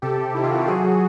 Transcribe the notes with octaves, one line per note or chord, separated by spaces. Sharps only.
C3 G4 A4
C3
D#3 E4
F4
C3 F#4
G4
F#3 F#4 G#4
F#3